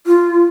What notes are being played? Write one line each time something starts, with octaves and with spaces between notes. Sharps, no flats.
F4